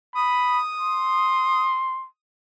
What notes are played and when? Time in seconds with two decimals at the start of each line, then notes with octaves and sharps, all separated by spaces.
0.15 B5 D#6
0.81 C6